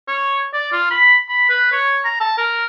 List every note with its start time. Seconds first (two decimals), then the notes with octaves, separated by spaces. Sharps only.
0.08 C#5
0.53 D5
0.72 F4
0.91 B5
1.29 B5
1.49 B4
1.72 C#5
2.05 A#5
2.20 A5
2.37 A#4